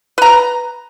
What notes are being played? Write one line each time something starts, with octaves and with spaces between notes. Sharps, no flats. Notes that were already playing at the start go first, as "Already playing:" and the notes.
B4 A#5